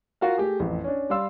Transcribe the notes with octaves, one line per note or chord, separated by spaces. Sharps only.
F4 F#4 A#4 F5
A3 G4 G#4
A1 F2
C#4 D4
G3 D5 F5 C6 E6